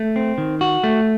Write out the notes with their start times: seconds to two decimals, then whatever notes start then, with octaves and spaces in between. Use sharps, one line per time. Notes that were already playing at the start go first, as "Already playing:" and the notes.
Already playing: A3
0.16 C4
0.38 D#3
0.61 F#4
0.84 A3